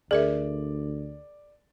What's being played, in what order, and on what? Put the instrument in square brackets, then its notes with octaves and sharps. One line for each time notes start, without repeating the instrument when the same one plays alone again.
[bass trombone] D2 [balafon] G#4 A#4 E5 [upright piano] D5